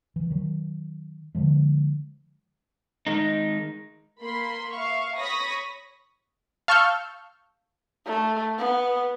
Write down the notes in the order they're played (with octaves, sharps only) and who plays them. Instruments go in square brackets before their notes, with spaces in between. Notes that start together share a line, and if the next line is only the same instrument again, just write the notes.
[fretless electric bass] E3
D#3 F#3
D3 D#3 F3 G#3
[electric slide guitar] D#3 G#3 D#4
[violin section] A#3 B5 C6
E5 F5 C#6
C#5 B5 C#6 D#6 A#6 B6
[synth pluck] F5 A5 C#6 E6 F6 G6
[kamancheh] A3
B3